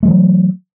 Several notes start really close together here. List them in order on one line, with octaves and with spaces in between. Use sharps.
A3 G3 E3 F#3